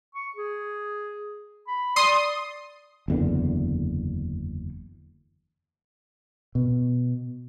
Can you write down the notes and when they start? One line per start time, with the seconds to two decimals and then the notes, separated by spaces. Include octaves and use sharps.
0.15 C#6
0.36 G#4
1.67 B5
1.96 D5 C6 D#6
3.08 F#1 E2 D3
6.55 B2